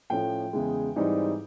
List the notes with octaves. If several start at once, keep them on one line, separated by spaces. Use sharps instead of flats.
A2 F3 A3 C#4 F4 G5
E2 C#3 E3 G#3
G#2 E3 G3 C4 D#4